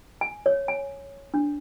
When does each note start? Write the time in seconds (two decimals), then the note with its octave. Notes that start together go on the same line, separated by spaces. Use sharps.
0.21 G#5
0.46 C#5
0.68 G#5
1.34 D4